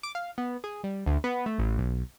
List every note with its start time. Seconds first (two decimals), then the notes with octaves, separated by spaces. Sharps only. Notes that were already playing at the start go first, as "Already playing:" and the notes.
0.03 D6
0.15 F5
0.38 B3
0.64 G#4
0.84 G3
1.06 D2
1.24 B3
1.46 A3
1.58 A1
1.78 B1